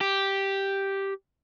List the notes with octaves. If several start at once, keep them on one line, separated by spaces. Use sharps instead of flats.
G4